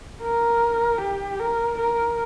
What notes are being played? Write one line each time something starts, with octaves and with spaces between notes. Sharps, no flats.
A#4
G4
A#4
A#4